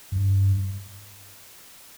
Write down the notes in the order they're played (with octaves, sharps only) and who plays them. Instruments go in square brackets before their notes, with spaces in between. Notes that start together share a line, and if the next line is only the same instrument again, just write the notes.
[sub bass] G2